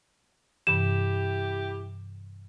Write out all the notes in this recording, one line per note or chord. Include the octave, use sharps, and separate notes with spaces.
G2 C3 E3 E4 G4 E7